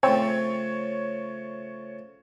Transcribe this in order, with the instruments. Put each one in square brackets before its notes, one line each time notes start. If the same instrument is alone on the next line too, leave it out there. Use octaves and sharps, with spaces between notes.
[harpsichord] C#3 F3 A3 [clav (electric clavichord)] C4 [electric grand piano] C#5